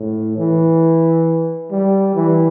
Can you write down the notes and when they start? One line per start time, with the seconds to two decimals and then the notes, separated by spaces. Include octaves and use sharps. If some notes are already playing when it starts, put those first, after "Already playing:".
Already playing: A2
0.38 E3
1.71 G3
2.15 E3